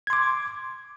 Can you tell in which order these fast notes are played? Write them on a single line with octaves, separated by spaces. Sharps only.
G#6 C6 D6